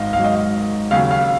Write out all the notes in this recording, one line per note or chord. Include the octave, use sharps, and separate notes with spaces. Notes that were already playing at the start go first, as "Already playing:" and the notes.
Already playing: G#1 G#2 D#5 F5
G#1 G#2 F#3 F5
D#5
F5
D#2 C#3 F#3 F5
F5